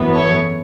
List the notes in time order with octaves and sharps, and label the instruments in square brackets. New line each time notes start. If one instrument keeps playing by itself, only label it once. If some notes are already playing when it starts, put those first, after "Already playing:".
Already playing: [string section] G#1 F#2 E3 B3
A4 C#5